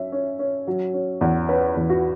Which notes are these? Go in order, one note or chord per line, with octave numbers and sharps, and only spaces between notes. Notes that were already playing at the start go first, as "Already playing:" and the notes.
Already playing: F#3 C#4 E5
C#4
C#4
F#3
C#4
E2
C#4 B4
E2
F#4